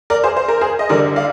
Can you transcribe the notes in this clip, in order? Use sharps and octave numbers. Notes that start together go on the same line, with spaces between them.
A#4 D5
G#4 C5
C5
A#4
G#4 C5
D#5
D3 G3 A#4 D5
D5 F5